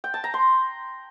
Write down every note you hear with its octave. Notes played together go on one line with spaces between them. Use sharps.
G5
A5
A#5
C6